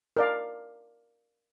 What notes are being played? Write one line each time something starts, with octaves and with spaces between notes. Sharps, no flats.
A#4 D5 F5